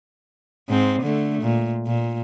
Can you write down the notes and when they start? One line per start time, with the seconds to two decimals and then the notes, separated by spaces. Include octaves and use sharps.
0.69 G#2 C4
1.02 D3 A3
1.42 A#2
1.87 A#2